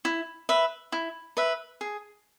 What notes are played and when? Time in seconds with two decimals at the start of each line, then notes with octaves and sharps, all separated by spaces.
0.05 E4
0.49 B4 E5
0.92 E4
1.37 B4 E5
1.81 G#4